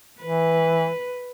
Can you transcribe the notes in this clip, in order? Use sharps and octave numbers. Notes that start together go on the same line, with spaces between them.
E3 B4